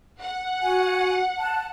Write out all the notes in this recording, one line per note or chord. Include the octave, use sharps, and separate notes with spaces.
F#5
F#4 G#5
A5 F#6